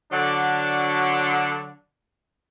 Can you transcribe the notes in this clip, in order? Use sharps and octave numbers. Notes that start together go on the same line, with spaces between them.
D3 F#3 D4